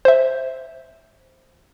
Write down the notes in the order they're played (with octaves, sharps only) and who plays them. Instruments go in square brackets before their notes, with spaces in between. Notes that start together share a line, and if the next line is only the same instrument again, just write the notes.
[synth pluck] C5 E5